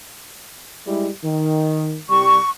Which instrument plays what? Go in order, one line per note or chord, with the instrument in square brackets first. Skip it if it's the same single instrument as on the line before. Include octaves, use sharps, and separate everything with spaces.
[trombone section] G3 G#3 E4
D#3
[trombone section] C2 G3 [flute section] C#6